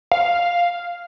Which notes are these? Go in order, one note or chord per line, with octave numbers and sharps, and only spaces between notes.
F5